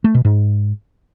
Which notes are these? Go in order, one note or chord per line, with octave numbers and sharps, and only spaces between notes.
A3
B2
G#2